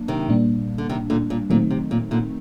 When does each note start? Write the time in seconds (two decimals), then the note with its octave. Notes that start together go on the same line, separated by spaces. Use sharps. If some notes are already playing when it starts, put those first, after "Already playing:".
Already playing: F#3 A#3 D4
0.08 C3 D#3
0.29 A#2 G3 A#3 D4
0.78 D3
0.89 C3 D#3
1.10 A#2 D3
1.30 A#2
1.50 A#2 D#3 F#3 A3 C4 D#4
1.71 C3
1.91 A#2
2.11 A#2 D3